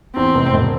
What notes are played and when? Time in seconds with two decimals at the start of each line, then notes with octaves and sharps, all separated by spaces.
0.16 E2 C4
0.34 F1
0.54 E1